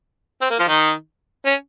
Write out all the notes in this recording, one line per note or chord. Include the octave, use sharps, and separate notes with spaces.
C4
A#3
F3 F4
D#3 D#4
C#4